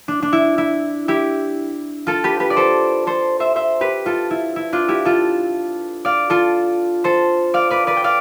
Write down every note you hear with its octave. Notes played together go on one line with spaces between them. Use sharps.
D4
D4
E4
E4
E4 G4
F4 A4
G4 B4
G4 B4
D5
A4 C5
A4 C5
C5 E5
C5 E5
G4 B4
F4 A4
E4
E4
D4 F4
E4 G4
F4 A4
D5 F5
F4 A4
A4 C5
D5 F5
B4 D5
B4 D5
G5
D5 F5